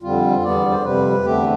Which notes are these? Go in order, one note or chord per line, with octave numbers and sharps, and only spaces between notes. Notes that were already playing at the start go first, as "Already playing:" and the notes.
F2 D3 G3 C4 F4
E2 D3 G3 B3 D5
C5
F2 C3 G3 B4
E2 D3 A3 C4 G4